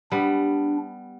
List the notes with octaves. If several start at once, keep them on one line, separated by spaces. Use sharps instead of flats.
G3 B3 D4